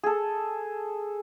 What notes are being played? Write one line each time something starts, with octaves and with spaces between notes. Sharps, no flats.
G#4 A4